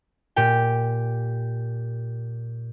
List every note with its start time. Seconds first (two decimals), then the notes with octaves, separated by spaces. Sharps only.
0.36 A#2 G4 G5